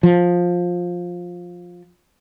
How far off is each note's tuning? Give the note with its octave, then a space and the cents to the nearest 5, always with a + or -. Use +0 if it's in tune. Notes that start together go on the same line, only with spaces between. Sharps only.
F3 +15